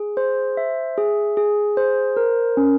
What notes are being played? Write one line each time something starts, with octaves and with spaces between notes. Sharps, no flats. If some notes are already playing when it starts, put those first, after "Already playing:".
Already playing: G#4
C5
E5
G#4
G#4
C5
A#4
C#4